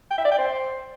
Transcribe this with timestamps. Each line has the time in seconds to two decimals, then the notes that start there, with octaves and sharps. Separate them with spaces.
0.11 G5
0.18 E5
0.25 D5
0.32 G5
0.38 C5